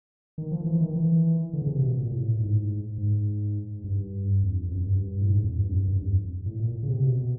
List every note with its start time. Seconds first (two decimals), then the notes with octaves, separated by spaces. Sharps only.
0.38 D#3
0.51 F3
0.66 E3
0.80 D#3
0.96 E3
1.53 D3
1.62 C#3
1.68 C3
1.82 B2
1.97 A#2
2.11 A2
2.40 G#2
2.98 G#2
3.84 G2
4.43 F2
4.71 F#2
4.85 G2
5.21 A2
5.30 G#2
5.44 F2
5.58 G2
5.73 F#2
5.88 G2
6.02 F2
6.46 A2
6.59 A#2
6.83 C#3
6.89 C3
7.03 B2